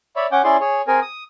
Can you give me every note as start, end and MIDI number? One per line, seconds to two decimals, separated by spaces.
0.16 0.27 73
0.16 0.27 74
0.16 0.27 76
0.16 0.27 83
0.32 0.42 61
0.32 0.42 78
0.32 0.42 86
0.32 0.42 91
0.44 0.57 61
0.44 0.57 64
0.44 0.57 68
0.44 0.57 74
0.44 0.57 84
0.61 0.82 68
0.61 0.82 73
0.88 1.00 60
0.88 1.00 68
0.88 1.00 70
0.88 1.00 80
1.02 1.23 87